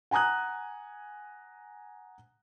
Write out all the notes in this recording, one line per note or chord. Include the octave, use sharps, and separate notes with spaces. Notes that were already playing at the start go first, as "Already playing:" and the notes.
F#5 G#5 A#5 D#6 F#6